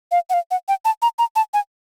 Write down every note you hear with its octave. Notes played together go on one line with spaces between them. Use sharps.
F5
F#5
F5
F#5
G5
A5
A#5
A#5
A5
G#5